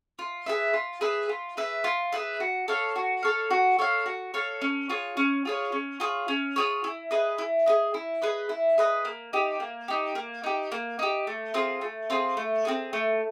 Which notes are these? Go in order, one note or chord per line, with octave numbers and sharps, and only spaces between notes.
F4
G#4 B4 E5
F4
G#4 B4 E5
F4
G#4 B4 E5
F4
G#4 B4 E5
F#4
A4 C#5 F5
F#4
A4 C#5 F5
F#4
A4 C#5 F5
F#4
A4 C#5 F5
C#4
F4 G#4 C#5
C#4
F4 G#4 C#5
C#4
F4 G#4 C#5
C#4
F4 G#4 C#5
E4
G#4 B4 D#5
E4
G#4 B4 D#5
E4
G#4 B4 D#5
E4
G#4 B4 D#5
A#3
D#4 G4
A#3
D#4 G4
A#3
D#4 G4
A#3
D#4 G4
A3
C4 F4 G#4
A3
C4 F4 G#4
A3
C4 F4 G#4
A3